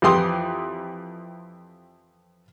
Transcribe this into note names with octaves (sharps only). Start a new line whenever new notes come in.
F2 E3 E4 G4 C6 D#6